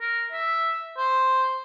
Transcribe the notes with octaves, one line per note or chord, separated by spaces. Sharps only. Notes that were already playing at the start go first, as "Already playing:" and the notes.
A#4
E5
C5